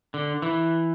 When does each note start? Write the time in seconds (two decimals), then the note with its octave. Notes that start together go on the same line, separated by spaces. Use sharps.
0.14 D3
0.42 E3